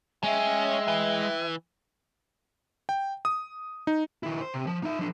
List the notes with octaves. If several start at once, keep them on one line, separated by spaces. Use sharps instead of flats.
G#3 C#4 E5 G5
E3
G5
D#6
D#4
D#3 E4
C5
C3
F3
D#4 E5
F3 D4